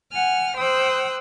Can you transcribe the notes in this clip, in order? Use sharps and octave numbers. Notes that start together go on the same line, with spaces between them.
F#5 G#5 F6
C5 G5 D#6 E6 F#6